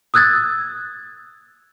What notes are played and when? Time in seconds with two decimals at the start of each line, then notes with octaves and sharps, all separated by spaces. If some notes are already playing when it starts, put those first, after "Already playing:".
0.14 D#6 E6 F#6 G#6 A6